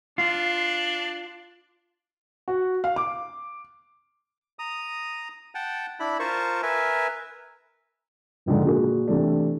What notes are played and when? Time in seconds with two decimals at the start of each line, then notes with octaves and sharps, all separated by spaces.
0.18 D4 F4
2.48 F#4
2.84 F5
2.96 D6
4.59 A#5 D#6
5.55 F#5 G5 A5
6.00 D4 E4 B5
6.19 F4 A#4 C5 A5 C#6
6.63 A#4 B4 E5 G#5
8.46 F1 A#1 G#2 D3
8.65 A#2 F#4 G#4 A#4
9.08 C3 E3 A3 D4